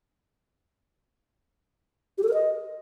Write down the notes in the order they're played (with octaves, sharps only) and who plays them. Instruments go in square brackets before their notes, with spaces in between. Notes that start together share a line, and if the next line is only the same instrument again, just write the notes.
[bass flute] G4
A4
A#4
D#5